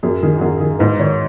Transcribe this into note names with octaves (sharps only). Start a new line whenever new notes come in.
F#2 G#4
D#3 G#4
F#4
F#2 G#4
D#3 G#4
G#2 B4
D#3 C#5